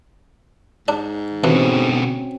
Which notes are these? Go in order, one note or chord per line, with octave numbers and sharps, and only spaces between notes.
G#2 D4
B2 D3 E3 C4 C#4 F#4